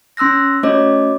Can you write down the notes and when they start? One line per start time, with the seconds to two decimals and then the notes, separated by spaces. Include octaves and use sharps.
0.17 C#4 C6 E6 F#6 A#6
0.63 A3 C#4 F#4 C#5 D#5 D6